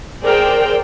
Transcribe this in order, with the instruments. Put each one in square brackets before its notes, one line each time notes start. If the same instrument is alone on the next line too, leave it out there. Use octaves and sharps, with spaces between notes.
[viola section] G#4 A#4 C5 D5 G5